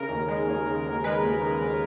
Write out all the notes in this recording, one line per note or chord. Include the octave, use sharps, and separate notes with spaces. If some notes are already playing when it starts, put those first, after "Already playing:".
Already playing: C#3 A#4
D#2
G#3
D#2
C#3
D#2
G#3 B4
D#2
C#3
D#2